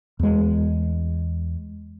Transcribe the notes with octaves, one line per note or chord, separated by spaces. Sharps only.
E2 G#3